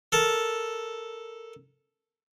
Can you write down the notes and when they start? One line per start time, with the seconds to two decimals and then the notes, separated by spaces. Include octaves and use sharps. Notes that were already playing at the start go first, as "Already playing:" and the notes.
0.12 A4 A#4 A5